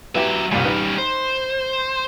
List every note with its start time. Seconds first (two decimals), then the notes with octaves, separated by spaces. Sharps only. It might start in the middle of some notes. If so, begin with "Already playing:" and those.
0.15 F#3 B3 E4 G4 E5
0.52 C2 A#2 G3 C#4
0.64 D#4 B4
0.98 C5